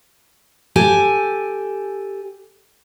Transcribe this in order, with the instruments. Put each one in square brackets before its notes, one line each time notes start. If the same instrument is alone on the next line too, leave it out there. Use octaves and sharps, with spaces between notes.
[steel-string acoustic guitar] G4 A4 G#5